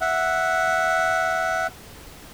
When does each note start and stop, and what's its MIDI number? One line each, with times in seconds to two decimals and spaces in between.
0.01 1.67 76
0.01 1.67 78